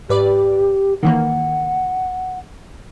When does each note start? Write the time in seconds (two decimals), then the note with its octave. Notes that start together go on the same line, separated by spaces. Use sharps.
0.09 G#2 G4 B4 D5
1.03 D#3 E3 A#3 F#5